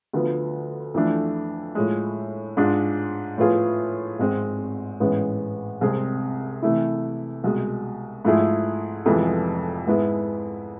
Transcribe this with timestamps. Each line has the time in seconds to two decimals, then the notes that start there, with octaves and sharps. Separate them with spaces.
0.13 D2 D3 F3 B3
0.94 F2 E3 A3 D4
1.75 A2 F3 G#3
2.57 G#2 G#3 D4 F4
3.38 A2 F3 B3 F4 G#4
4.19 G#1 G#2 G#3 C4
5.00 A1 G#2 E3 G#3 B3
5.81 C2 C3 G#3 C4 G#4
6.62 C3 E3 A3 E4
7.44 C2 B2 G#3
8.25 G#2 F3 A3 E4 G#4
9.06 F1 F2 E3 G#3 B3
9.87 G#2 G#3 B3 E4